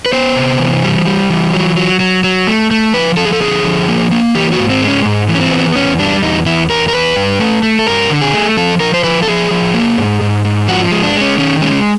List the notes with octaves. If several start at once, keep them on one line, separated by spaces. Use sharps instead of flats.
B4
B3 C5
C3
E3
G3
G3
E3
F#3
F#3
F#3
F#3
A3
A3
F3 B4
F3 A4
G#4
A4
D3 G#4
F3
A#3
A#3
E3 G4
F#4
G#2
C4
G#3
C#4
G#2
E3
C#4
C4
B3
E2 C#4
G3 D4
E2 D#4
E2 E4
E2 A#4
A#4
E2 B4
G2
A3
A3
A4
G2 A#4
D3
G#4
A3
F3 A4
F3 A#4
C5
F3 B4
A4
F3 G#4
F3
A#3
G#2
G#2
G#2
F3 F#4
G#3
D4
G#3
C#4
D#3 C#4
G#3 C#4